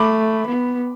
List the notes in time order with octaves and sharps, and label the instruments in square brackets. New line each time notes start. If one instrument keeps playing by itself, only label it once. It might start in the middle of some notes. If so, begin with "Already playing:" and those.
Already playing: [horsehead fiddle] A3 [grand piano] B5 D6
[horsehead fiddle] B3